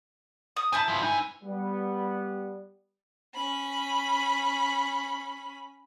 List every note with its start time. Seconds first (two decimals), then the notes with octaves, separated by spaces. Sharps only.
0.56 D#6
0.73 C4 E4 B4 G#5 A5
0.88 G#2 F3
1.02 D#4 G#5
1.43 G3 B3
3.34 C#4 B5